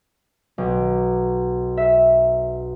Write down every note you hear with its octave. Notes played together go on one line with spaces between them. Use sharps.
B1
E5